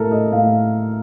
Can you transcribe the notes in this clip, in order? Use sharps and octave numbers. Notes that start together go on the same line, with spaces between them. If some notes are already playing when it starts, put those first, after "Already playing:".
Already playing: A2 A4 A#4
D#5
A2 F5